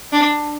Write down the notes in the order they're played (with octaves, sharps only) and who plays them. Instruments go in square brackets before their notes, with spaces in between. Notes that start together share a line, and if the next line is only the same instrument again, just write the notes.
[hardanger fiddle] D4